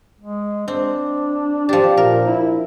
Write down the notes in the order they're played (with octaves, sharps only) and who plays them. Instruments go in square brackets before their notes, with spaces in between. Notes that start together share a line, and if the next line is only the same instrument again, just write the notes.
[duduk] G#3
[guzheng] C4 [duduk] D4
[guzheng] F3 D4 [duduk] G4
[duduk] A#2 [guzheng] A#4
[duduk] E4